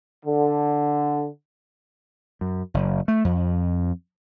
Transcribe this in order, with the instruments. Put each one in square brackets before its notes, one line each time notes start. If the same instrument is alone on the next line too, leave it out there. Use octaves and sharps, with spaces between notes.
[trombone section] D3
[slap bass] F#2
F#1
A3
F2